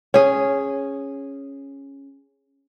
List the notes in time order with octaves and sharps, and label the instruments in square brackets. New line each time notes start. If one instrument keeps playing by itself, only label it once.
[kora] C#4 G#4